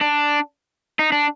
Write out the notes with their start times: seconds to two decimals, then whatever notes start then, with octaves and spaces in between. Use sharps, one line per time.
0.01 D4
0.99 D#4
1.12 D4